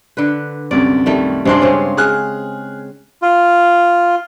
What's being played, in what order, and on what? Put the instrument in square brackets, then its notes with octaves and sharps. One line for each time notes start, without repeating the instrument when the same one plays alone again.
[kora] D3 B4
[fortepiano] C2 F#2 [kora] D5
[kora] D#3 G3 A3
[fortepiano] G2 C6 [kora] C3 G#3 D4
[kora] C#3 C4 C#4
[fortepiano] G#4 F6 F#6
[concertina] F4